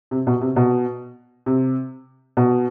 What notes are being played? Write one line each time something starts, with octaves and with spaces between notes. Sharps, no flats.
C3
B2
C3
B2
C3
B2